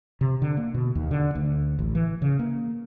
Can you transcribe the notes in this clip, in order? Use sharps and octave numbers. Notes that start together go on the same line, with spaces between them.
C3
D3
A#3
B2
D#2
D3
D2
A1
E3
C#3
A#3